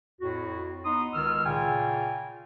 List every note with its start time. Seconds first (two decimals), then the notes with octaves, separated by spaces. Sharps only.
0.21 F2 A2 F#4
0.85 B3 D#4 C6 D#6
1.13 C#2 D#3 E6 F6
1.45 A#2 C#3 F4 G5 G#5